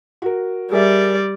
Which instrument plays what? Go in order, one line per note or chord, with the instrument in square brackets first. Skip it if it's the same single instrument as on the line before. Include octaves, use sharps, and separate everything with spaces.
[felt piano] F#4 A#4
[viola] G3 D5 [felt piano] G#4 A#4 E5